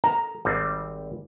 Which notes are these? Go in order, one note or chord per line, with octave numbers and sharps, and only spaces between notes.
A4 A#5
G#1 G3 C4